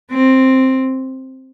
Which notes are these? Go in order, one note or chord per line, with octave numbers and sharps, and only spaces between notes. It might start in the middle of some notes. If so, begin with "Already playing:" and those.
C4